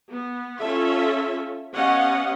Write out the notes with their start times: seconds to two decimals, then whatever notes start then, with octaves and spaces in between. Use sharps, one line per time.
0.10 B3
0.59 C#4 F4 A4 E5
1.74 B3 C#4 G4 D#5 F5 F#5